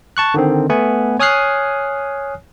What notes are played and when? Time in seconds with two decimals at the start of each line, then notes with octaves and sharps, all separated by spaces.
0.17 A5 C#6 F#6
0.34 D3 D#3 C4
0.69 A3 B3 F#5 G#5
1.19 C#5 G#5 D#6 F6 F#6 C7